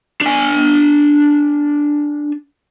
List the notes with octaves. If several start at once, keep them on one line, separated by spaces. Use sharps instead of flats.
D4 G#5